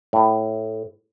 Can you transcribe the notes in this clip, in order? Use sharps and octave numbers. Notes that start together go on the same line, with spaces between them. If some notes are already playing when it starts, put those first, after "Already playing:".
A2